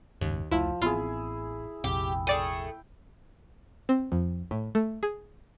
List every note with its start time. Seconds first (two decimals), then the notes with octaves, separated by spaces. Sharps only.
0.21 F#1 D#2 G#2 C#3
0.51 F1 C#2 F3 A3 E4
0.82 A1 B3 C4 E4 F4 G#4
1.84 A#1 F2 C3 G4
2.27 A3 G#4 D5 G5 D#7
3.89 C4
4.12 F2
4.51 A2
4.75 A3
5.03 G#4